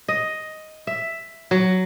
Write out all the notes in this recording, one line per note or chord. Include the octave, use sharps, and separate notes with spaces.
D#5
E5
F#3